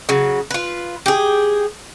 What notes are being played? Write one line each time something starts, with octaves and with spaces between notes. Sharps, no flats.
C#3 F#3
F4 B4
G4 G#4